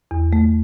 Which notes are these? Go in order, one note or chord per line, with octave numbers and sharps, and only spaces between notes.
E2
A3